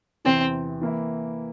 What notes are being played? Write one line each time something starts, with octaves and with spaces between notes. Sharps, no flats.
E2 C3 E3 C4
E3 A#3 E4